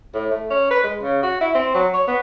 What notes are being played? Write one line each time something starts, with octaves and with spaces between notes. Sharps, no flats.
A2
A3
C#4
B4
G#3
C#3
F#4
E4
C4
F#3
C#5
B3